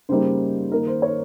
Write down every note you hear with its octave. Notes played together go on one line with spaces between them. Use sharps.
C#3 G3 A#3 D#4 C5
D#3 A#3 D#4 A#4
C5
C#5